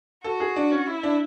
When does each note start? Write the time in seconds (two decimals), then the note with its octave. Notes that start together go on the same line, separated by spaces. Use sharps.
0.24 F#4 A4
0.40 G#4
0.56 D4
0.71 C#4
0.88 E4
1.03 D4